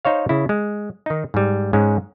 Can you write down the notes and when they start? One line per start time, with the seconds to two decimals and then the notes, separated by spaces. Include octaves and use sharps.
0.05 D#4 C5 C#5 F5
0.29 C#3 E4
0.49 G#3
1.06 D#3 D#4
1.34 G#2 G3
1.73 G#2 G#3 C#4